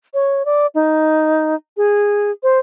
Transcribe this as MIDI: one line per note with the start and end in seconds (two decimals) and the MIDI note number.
0.14 0.45 73
0.45 0.67 74
0.75 1.55 63
1.77 2.31 68
2.43 2.59 72